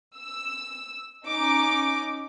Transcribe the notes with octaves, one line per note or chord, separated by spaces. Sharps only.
E6
C#4 D#4 D6